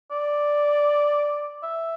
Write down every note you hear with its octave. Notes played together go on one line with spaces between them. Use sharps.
D5
E5